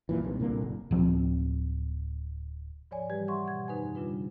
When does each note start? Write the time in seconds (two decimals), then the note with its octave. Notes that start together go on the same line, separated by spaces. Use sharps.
0.09 F#2 A#2 E3
0.24 B1 C3
0.40 C2 A#2 D3 A#3
0.62 F#1
0.91 D1 F3 C4
2.91 G#2 F3 C#5 D5 G#5
3.10 E3 G3 G4 B4 G#6
3.28 B4 E5 F#5 C6 C#6
3.44 B2 F#5 G#6
3.68 F#2 D#3 D#4 B4 C5 G#5
3.95 C#3 G3 D4 F4 B4